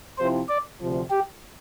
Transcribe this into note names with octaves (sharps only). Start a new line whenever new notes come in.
C3 F3 C4 E4 C5
D5
D2 C3 F3
G4